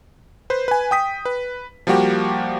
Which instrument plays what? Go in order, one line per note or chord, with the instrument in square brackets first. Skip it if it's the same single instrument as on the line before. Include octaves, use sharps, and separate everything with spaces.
[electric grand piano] B4 C5
B4 G#5
G5 D#6 B6
B4
F3 G3 A#3 F#4 G4